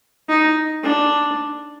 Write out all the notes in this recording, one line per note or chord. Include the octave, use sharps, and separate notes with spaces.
D#4
D4